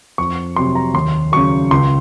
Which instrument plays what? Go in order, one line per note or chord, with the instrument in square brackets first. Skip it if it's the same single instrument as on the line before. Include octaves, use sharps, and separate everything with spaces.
[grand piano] F2 C#6
C3 F#3 C6
A#5
D#2 C6
C#3 F#3 C#6
C#2 C6